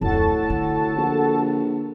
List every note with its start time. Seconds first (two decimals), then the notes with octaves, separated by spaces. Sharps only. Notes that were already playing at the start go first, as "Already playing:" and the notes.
0.01 D1 F2 A2 F#4 A4 A5
0.50 D3
0.97 A#1